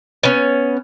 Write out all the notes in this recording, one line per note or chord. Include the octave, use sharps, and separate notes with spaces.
B3 C#4